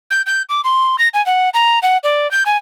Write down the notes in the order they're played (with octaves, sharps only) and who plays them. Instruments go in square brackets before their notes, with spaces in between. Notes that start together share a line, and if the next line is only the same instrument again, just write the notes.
[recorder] G6
G6
D6
C6
A#6
G#5
F#5
A#5
F#5
D5
G6
G#5